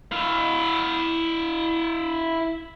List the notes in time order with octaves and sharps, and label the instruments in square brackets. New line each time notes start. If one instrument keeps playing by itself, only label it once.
[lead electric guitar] E4 F5